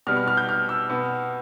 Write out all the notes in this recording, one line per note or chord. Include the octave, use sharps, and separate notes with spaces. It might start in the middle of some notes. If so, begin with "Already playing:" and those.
B2 G3 B3 F6
F6
F6
G6
F6
E6
B2 B3